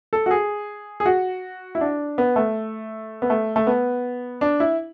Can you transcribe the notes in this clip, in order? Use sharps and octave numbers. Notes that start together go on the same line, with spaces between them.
A4
F#4
G#4
G#4
F#4
E4
D4
B3
A3
B3
A3
A3
B3
D4
E4